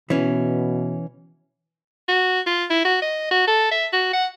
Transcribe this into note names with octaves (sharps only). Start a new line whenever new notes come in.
B2 E3 C#4
F#4
F4
E4
F#4
D#5
F#4
A4
E5
F#4
F#5